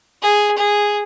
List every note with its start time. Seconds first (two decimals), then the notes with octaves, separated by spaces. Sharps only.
0.22 G#4
0.57 G#4